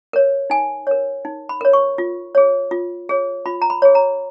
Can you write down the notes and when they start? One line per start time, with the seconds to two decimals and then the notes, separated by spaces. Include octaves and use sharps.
0.13 A#4 C#5
0.50 D#4 G#5
0.87 A#4 C#5
1.25 D#4
1.49 B5
1.61 A#4 C#5
1.73 C#6
1.98 F4
2.35 G#4 C#5
2.71 F4
3.09 G#4 C#5
3.46 F4 B5
3.62 A#5
3.70 B5
3.82 G#4 C#5
3.95 A#5